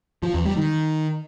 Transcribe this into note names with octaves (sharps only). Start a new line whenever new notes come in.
F3
E2
G3
D#3